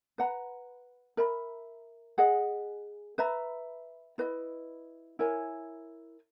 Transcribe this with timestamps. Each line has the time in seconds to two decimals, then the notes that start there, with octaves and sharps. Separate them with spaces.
0.18 B4 F#5 A#5
1.17 A#4 E5 B5
2.18 G#4 D#5 F#5
3.18 B4 E5 A#5
4.18 E4 B4 D#5
5.19 E4 A#4 C#5 G#5